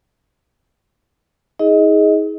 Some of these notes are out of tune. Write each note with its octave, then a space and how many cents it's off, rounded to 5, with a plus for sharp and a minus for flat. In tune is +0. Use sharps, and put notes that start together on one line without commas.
D#4 +45 G#4 +5 D#5 +15